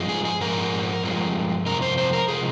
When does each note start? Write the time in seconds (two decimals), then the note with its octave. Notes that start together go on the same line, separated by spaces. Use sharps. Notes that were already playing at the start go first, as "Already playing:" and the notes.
Already playing: G2 F3 G#3
0.09 G#4
0.25 G#4
0.41 G#2 F3 A#4
1.03 G2 F3 G#3
1.66 F2 C3 A#4
1.82 C5
1.98 C5
2.13 A#4
2.28 C3 F3 G#3 G#4